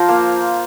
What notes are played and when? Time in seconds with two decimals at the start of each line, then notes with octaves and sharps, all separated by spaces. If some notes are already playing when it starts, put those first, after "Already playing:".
Already playing: F3 F4 C5 F5 A#5
0.09 A#3